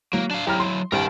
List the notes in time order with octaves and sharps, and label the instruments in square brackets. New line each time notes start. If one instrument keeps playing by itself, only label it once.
[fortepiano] F#3 [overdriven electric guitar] A#3
[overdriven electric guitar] D4 F5
[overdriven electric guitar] F#3 E4 [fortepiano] G4 A#5 F6
[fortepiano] C6
[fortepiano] C2 G2 [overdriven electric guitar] A#4 G5